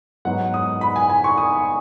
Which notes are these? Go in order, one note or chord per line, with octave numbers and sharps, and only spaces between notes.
G#2 F#3 B3 D#4 F#5
D#6
B5
G#5
G#5
C#6
D#6